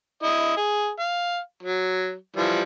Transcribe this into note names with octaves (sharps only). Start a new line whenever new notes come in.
E4 D#5
G#4
F5
F#3
E3 F3 G3